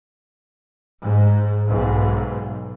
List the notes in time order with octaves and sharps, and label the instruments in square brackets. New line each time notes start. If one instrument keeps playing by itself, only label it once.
[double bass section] G#2
B1 G#2